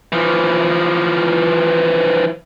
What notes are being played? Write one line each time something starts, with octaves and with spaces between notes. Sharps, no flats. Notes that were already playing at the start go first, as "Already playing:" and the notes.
E3 F3